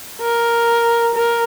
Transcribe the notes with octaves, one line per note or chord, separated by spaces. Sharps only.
A#4
A#4